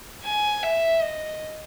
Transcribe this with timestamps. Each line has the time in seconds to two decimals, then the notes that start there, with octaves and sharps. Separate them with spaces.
0.25 G#5
0.62 E5
1.01 D#5